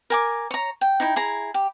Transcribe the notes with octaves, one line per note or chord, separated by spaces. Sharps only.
A#4 G#5 D6
C#5 A#5
G5
D#4 E4 G5
E4 G#4 A#5
G4